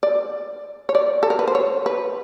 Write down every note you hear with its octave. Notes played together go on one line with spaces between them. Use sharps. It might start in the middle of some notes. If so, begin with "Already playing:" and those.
D5
C#5
D5
A4
A#4
B4
C5
C#5
B4